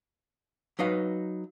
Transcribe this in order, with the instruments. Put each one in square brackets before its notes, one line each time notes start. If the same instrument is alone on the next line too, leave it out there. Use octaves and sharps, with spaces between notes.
[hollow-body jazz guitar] F#3 D#4 B4 F5